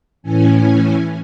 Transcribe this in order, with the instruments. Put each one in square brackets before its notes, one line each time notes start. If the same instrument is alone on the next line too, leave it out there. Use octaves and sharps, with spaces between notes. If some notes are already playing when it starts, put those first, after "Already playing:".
[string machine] A2 E3 C#4 G#5